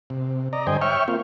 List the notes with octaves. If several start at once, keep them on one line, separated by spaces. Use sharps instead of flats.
C3
D5 D#5 A#5
G2 D3 C5 D#5 G5 G#5
C#5 E5 G5 C#6 F6
A#3 C4 F4